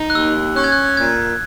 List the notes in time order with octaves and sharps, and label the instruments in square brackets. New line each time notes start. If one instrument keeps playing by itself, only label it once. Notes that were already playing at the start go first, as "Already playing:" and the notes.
Already playing: [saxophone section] D#4
[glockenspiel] F#6
[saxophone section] D#2 [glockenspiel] E6
[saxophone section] C#4 [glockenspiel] F#6
[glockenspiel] G#6
F#6
[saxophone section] A#2 [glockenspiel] G#6